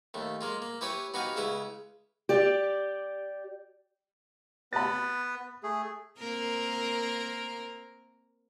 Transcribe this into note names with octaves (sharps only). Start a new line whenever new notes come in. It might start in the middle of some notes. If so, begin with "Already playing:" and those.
D#2 A3
G#3 A#3 F4
A#3
E4 G4 B4 C#5 G#5 B5
B3 D#4 F#4 G4 F5 G#5
C#2 C#3 E4 B4 D#6
G4 D5
B3 B4 B5 A6
A3 G#4
A#3 C4 A#4